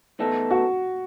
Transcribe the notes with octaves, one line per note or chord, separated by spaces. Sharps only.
A2 E3 B3 D#4 A4
F#4